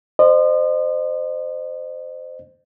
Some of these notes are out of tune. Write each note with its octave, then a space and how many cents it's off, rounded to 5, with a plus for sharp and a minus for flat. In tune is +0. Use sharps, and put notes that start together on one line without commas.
C5 -10 D#5 -40